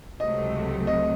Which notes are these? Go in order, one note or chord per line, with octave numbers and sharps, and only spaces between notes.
C#2 C3 F#3 A3 D#5
D#5